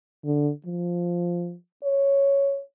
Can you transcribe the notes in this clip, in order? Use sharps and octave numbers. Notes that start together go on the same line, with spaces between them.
D3
F3
C#5